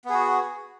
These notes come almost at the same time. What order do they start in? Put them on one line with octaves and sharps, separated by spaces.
B3 G#4 F#4